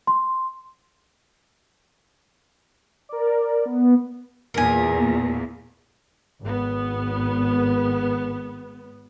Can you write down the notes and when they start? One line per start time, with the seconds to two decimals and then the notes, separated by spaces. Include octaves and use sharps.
0.07 C6
3.09 A#4 D5
3.65 B3
4.54 E2 A#2 A#4 G#5
6.41 G#1 B3